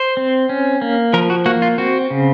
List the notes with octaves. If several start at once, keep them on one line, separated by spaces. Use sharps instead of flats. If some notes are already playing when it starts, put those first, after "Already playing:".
Already playing: C5
C4
C#4
A#3
F3 A#4
F#4
A#3 F#4
F4
C4 F#4
C#3